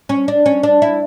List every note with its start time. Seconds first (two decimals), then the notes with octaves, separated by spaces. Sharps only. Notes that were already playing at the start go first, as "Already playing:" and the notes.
0.09 C#4
0.28 D4
0.46 C#4
0.63 D4
0.82 E4